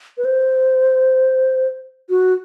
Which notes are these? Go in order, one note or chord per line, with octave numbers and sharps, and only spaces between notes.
B4
C5
F#4